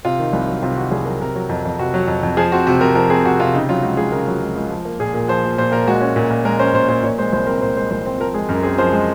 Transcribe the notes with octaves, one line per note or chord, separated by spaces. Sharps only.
C3 F4
D#3
C2
F#3
C3 F4
D#3 F#4
C2 G#4
F#3 A#4
C3 A#4
F#3
F2
F2
C3 F#4
F#3
F2
F2
F3 G#4
C4 F#4
C3 F#4
C3 A#4
F3 A#4
C4 G#4
C3 F#4
C3 F4
C#3 D#4
F#3 F4
C#2 F#4
C#2 G#4
C#3 A#4
F#3
C#2
C#2
F3
A#3
A#2 G#4
A#2
F3 C5
A#3
A#2 C5
A#2 A#4
G#3 F#4
C#4
A#2
A#2
G#3 A#4
C#4 C5
A#2 C5
A#2 C5
A#2 C#5
G#3 C5
C2 C5
C4 A#4
A#2 C5
G#3 C5
C2 C5
C4
F3 A#4
G#3 G#4
F#2 A#4
C4 G#4
F3 C5
G#3